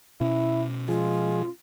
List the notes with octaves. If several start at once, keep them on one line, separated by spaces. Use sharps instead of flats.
B2 C#4 E4
F3 G#3 F4 G#4